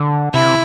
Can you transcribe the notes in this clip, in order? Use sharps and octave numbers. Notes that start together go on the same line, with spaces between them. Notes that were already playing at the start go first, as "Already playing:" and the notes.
Already playing: D3
C3 E4